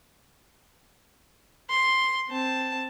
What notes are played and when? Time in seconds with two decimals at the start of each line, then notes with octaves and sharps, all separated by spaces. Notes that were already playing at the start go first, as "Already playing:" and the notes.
1.70 C6
2.29 C4 A5